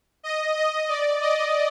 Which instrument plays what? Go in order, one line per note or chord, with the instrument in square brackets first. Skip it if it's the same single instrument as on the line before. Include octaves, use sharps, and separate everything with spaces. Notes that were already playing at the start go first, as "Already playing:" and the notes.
[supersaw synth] D#5
D#5
D5
D#5